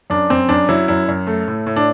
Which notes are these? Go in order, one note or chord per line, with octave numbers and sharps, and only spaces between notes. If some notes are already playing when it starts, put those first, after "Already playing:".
F#2 D4
F#2 C4
F#2 D4
F#3 E4
F#2 E4
F#2
A3
A2
A2
D4